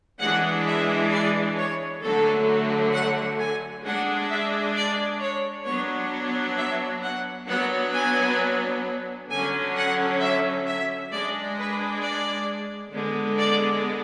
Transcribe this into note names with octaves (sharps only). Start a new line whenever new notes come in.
E3 G#3 D4 F#5
E5
D5
C#5
D3 F#3 A3 A4
F#5
G#5
G#3 D4 F#5
E5
D5
C#5
F#3 B3 D4 C#5
E5
F#5
F#3 B3 D4 F#5
G#5
D3 F#3 C#4 G#5
F#5
E5
E5
G#3 D4 D5
B4
D5
D3 G#3 B3
D5